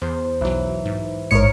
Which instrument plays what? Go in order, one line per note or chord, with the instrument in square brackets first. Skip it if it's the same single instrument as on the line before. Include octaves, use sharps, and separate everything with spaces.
[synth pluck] E2 [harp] C5
[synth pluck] B1 F#3 [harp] E3
[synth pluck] G#2
[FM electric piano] A1 G#2 C#7 [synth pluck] A#4 C#5